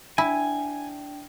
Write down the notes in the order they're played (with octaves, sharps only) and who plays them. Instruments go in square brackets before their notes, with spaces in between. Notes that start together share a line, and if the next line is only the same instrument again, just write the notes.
[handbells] D4 G5 [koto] E4 [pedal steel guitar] G#5